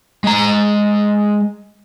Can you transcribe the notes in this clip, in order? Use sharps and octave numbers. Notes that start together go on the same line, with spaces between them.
G#3 A#5